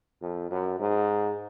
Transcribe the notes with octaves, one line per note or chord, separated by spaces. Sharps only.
F2
F#2
G#2